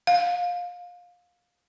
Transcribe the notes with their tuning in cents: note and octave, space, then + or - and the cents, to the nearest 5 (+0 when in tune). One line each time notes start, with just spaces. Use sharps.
F5 +25